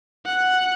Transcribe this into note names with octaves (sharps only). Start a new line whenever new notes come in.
F#5